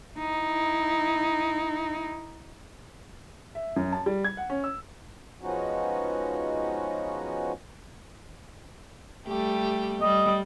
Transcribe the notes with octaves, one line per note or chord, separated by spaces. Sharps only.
D#4 E4
E5
F#2
A5
G3
G#6
F#5
C#4
E6
F3 G#3 B3 C#4 D#4 F#4
G3 A3 G4
G3 D#5